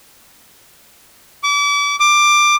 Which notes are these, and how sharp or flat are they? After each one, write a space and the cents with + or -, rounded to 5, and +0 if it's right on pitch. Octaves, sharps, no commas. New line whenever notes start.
D6 -35
D6 +15